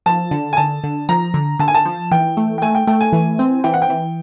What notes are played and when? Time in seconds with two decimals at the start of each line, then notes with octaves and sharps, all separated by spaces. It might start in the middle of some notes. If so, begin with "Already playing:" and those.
0.06 F3 A5
0.31 D3
0.53 G#5
0.57 D3 A5
0.84 D3
1.09 F3 A#5
1.34 D3
1.59 D3 A5
1.68 G#5
1.74 A5
1.85 F3
2.12 E3 G5
2.37 A3
2.58 G5
2.62 A3 G#5
2.75 G5
2.87 A3 G5
3.01 G#5
3.13 E3
3.39 C4
3.64 E3 G5
3.74 F#5
3.82 G5
3.90 E3